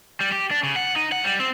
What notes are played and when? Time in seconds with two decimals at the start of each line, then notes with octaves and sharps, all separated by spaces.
0.21 G3
0.32 G4
0.51 D4
0.63 C#3
0.76 F#5
0.96 D#4
1.12 F#5
1.24 G3
1.40 C4